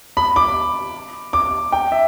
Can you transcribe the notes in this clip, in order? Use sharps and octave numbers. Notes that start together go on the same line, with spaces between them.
B5
D6
D6
G5
E5